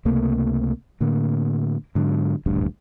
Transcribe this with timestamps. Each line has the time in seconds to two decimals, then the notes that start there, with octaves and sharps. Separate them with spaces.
0.05 C#2 C3 A3 A#3
1.01 A2 D3 A#3
1.95 G#2 D3 F#3
2.46 D#1 A1 D2 G2